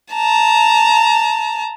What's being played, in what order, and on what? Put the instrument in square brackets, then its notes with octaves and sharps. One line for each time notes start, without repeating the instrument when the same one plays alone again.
[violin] A5 A#5